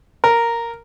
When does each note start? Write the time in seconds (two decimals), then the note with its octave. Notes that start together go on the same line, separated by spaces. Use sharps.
0.24 A#4